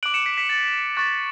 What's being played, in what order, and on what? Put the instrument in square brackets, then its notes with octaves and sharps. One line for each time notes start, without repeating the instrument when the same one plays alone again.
[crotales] D6 F#6 D7 F#7
C#7 E7
B6 D7
B6
A6
C#6 F#6 A6